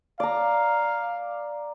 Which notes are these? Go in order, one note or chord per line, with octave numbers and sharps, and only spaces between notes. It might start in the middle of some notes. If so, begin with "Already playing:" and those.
D5 F5 A#5